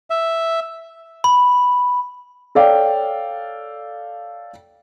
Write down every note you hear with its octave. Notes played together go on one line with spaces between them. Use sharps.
E5
B5
A4 C#5 D5 F5 G5